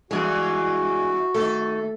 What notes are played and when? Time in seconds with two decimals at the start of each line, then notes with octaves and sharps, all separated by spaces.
0.11 E2 G2 E3 G#3 F#4 G#4
1.34 D#3 A3 A4